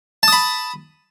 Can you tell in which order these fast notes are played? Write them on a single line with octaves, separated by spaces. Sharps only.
A5 D#6 B5